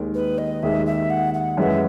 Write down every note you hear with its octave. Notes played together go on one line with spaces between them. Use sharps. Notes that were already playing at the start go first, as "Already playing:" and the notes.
Already playing: D#2 D#3 G#3
B4
D#5
D#2 D#3 G#3 E5
E5
F#5
F#5
F#2 E3 G#3 E5